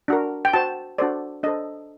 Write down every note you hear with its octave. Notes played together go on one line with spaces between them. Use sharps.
D4 F#4 A#4
G5
F#4 C5 A5
D4 F#4 A4 C5 D5
D4 A4 C5 D#5